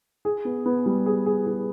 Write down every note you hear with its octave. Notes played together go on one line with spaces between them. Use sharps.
G#4
B3
B3
G3
G#4
G#4
G#4